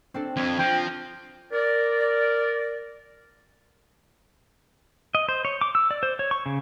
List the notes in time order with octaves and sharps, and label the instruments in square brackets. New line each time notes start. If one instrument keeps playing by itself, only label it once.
[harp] C4 D4 A4
[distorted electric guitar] F2 [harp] G#6
[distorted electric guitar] F3 [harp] F4 A#6 [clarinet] G5
[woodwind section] A#4 D5
[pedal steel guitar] D#5
C5
C#5
D6
E6
D5
C5
C#5
C#6
C#3